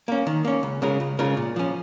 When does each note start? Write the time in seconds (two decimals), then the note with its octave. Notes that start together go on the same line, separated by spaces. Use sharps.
0.08 A#3 C#4
0.27 D#3
0.45 A#3 C#4
0.63 C#2
0.82 C#3 G#3 F4 A#4
1.00 C#2
1.19 C#3 G#3 F4 A#4
1.37 A#2
1.56 F3 C#4